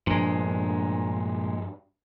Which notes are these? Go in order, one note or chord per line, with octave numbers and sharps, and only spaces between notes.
G2 A#2 F3 G#3 D4